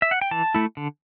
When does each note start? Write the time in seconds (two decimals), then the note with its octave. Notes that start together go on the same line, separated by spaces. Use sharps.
0.02 E5
0.11 F#5
0.21 G5
0.31 E3 A5
0.55 A3 E4
0.77 D3